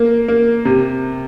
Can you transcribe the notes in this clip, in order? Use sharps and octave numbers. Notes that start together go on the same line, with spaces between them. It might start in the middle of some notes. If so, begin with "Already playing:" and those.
Already playing: A#3
A#3
C3